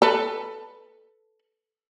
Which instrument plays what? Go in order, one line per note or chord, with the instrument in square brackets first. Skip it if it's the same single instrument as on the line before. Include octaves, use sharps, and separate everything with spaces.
[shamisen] A4 B4